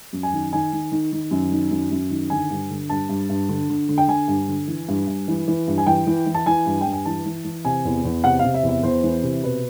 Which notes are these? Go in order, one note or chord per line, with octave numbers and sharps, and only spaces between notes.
F#2
G#5
D#3
D#3 G#5
D#3
D#3
D#3
F#2
D#3
F#2
F#2
D#3
D3 G#5
G2
D3
G2 A5
G2
G2
D3
D3
D3
G5
D3 G#5
G2
D3
E3
G2
G2
E3
E3
G2
G#5
E3 G5
E3
E3
A5
E3 G#5
G2
G5
G2
G#5
E3 A5
E3
E3
C3 G#5
E2
E2
C3 F#5
F5
C3
E5
E2
E5
E2 C5
E3
C3
B2 B4